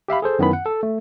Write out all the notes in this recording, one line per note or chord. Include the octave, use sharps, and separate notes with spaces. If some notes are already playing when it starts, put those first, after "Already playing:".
G4 E5 F5 B5
G#4 A4 C5
F#2 D#3 B3 C#4 E4 B5
F#5
A4
A3